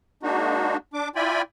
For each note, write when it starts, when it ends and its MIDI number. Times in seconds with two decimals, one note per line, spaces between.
0.23 0.77 56
0.23 0.77 58
0.23 0.77 62
0.23 0.77 63
0.23 0.77 66
0.94 1.09 62
0.94 1.09 86
1.16 1.42 64
1.16 1.42 65
1.16 1.42 74
1.16 1.42 79
1.16 1.42 80
1.16 1.42 83